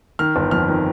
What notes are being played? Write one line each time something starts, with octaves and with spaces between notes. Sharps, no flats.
D#3 F6
G1
F2 F6
D#3